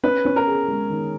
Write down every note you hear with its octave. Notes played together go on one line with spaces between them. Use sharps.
C#4 B4
C#4
A#4
G#4
G#3
D#3